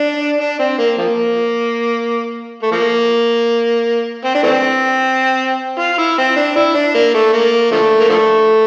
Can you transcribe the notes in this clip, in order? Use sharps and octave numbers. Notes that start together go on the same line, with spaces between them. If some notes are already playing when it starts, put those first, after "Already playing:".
Already playing: D4
D4
C4
A#3
F3 A#3
A3
F3 A#3
C4
D4
E3 A3 C4
F4
E4
C4
D4
E4
D4
A#3
A3
A#3
D3 F3 A3
A#3
D3 F3 A3